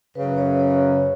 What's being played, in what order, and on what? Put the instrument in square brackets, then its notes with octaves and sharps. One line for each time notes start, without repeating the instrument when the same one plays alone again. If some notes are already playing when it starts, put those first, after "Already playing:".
[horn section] F#2 C#3 F#3 [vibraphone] B4
[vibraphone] C#5
C#5